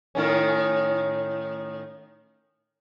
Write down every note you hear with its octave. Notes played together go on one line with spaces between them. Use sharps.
A2 D#3 C#4